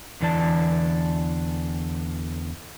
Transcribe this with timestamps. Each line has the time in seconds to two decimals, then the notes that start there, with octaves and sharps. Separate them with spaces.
0.21 E2 D3 E3 D5 A5